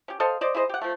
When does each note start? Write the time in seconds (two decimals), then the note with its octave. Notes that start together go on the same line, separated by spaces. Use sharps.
0.08 C#4 G4
0.20 A4 C5 D#5 F5
0.41 C5 D5 D#5
0.55 E4 G#4 C5 D#5
0.69 G4 F#5
0.82 F3 A3